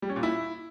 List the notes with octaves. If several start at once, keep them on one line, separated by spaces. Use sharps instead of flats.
G3
C#4
A#2
E4